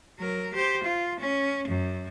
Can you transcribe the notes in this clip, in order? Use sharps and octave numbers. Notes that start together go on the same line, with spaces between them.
F#3 A#4
G4 C5
F4
C#4
F#2